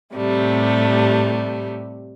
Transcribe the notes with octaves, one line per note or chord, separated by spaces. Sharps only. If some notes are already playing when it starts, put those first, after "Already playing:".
A2 C3 G3 A3